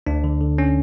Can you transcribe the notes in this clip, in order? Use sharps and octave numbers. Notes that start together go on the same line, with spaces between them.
D2 D4
D3
D3
C#4